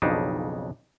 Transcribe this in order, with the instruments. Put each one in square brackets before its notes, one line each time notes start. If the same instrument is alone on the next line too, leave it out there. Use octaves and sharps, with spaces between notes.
[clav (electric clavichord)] B1 F2 C#3 D4 D#4